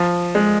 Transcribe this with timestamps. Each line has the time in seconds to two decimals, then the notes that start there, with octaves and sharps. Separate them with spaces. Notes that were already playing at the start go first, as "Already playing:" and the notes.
Already playing: F3
0.35 G#3